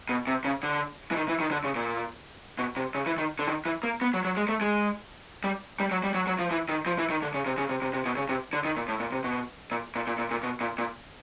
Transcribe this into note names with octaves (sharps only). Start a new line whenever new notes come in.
B2
C3
C#3
D3
E3
D#3
E3
D#3
D3
C#3
A#2
B2
C3
C#3
E3
D#3
D3
D#3
E3
A#3
B3
F#3
F#3
G#3
A3
G#3
G3
G3
F#3
G3
F#3
F#3
F3
E3
D#3
F3
E3
D#3
D3
C#3
C3
C#3
C3
C3
C3
B2
C#3
C3
D3
D#3
A#2
A2
A#2
C3
B2
A#2
A#2
A#2
A#2
A#2
B2
A#2
A#2